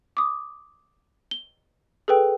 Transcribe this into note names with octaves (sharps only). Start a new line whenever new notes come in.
D6 D#6
G7
G#4 A4 B4 G5